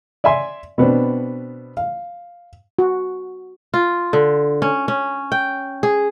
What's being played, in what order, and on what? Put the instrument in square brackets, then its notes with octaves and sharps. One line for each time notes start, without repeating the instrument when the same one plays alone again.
[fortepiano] D5 E5 G#5 C6
B2 B3 C4 D4
F5
[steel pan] F#4
[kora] F4
D3
C#4
C#4
G5
G#4